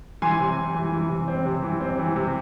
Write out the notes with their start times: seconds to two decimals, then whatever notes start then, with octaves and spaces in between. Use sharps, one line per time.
0.22 E3 G#5 C6
0.39 C3
0.57 C3
0.74 E3
0.92 E3
1.09 C3
1.28 C4
1.45 C3
1.62 E3
1.81 C4
1.98 E3
2.16 C3